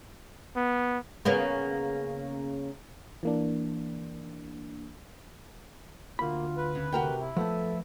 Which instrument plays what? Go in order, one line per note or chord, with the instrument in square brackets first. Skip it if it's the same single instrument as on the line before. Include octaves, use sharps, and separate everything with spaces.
[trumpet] B3
[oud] C#3 A#3 B3
[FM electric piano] E3 A#3 D4
[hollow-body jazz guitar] D2 B5 [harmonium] A#3 [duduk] F4
[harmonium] B4
[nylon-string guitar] C#3
[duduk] C3 [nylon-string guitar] F#4 A#4 G5
[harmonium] E4
[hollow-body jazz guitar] F3 A3 [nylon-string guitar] B3 [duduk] A4